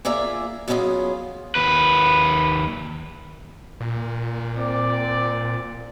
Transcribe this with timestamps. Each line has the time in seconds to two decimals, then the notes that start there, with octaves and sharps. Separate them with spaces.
0.05 A#3 F4 G#4 D5 E5 A#5
0.68 F#3 B3 C#4 D#4 F4 G#4
1.55 D#2 B4
3.80 A#2
4.58 C4 D5